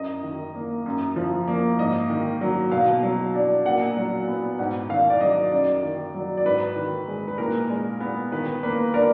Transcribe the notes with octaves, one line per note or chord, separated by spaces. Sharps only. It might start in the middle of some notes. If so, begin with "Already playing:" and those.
Already playing: F#2 D#5
D#3
A#3
F#2
F3
A#3
G#2 D#5
D#3
F#3
B2 F5
F#3
D4
A#2 F#5
F#3
B3
G#2 F#5
D#3 F5
D5
F#3 D#5
F#2 D5
D#3
F#3
D5
G#2 B4
D#3
G#3
B4
A#2 A#4
G#3
B3
D#3 B4
A#3 B4
D4 A#4